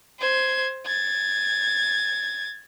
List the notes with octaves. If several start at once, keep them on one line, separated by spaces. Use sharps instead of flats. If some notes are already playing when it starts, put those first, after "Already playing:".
C5 G#6
G#6 A6